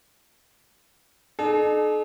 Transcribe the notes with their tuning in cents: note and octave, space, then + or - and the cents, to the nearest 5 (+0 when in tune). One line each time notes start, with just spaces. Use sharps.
D#4 -40 A4 -45